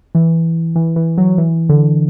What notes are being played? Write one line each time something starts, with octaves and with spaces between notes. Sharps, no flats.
E3
E3
E3
F#3
E3
D3